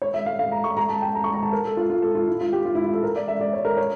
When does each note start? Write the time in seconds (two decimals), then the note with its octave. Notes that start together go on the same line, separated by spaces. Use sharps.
0.02 C#5
0.14 E5
0.26 F5
0.39 F5
0.52 A#5
0.64 C#6
0.77 A#5
0.89 A5
1.02 G5
1.15 A#5
1.24 C#6
1.34 A#5
1.43 A5
1.52 A#4
1.65 A4
1.77 F4
1.90 F4
2.02 A4
2.15 F4
2.27 E4
2.41 F4
2.52 G4
2.65 F4
2.75 E4
2.84 F4
2.93 A4
3.03 A#4
3.16 D5
3.28 E5
3.41 D5
3.53 C#5
3.65 A#4
3.77 C#5